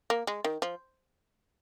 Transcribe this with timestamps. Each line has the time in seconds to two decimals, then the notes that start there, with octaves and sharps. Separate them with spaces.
0.10 A#3
0.27 G#3
0.44 D#3
0.62 F3